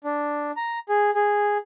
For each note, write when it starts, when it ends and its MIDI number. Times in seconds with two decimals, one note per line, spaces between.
0.04 0.51 62
0.57 0.79 82
0.89 1.11 68
1.15 1.58 68